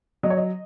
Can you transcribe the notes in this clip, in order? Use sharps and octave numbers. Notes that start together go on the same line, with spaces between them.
F#3 D#5
C#5
D#5